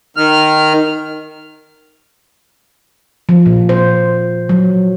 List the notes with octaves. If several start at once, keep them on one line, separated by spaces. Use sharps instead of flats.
D#3 F6
F3
A#2
C5
F#3